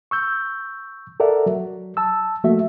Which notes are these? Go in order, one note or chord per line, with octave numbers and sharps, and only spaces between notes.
C#6 E6 G6
A4 A#4 D5 E5 F#5
F#3
A5 E6
F3 A3 A#3 F#4 E5